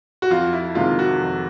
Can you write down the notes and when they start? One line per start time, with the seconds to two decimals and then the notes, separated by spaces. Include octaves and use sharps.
0.22 F#4
0.30 F2 F4
0.53 E4
0.75 C3 D#3 G#3 F4
0.99 F#4
1.21 F2